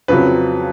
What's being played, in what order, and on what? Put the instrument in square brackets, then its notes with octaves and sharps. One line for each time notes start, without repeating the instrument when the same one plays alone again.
[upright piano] F2 C#3 F#3 [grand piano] B4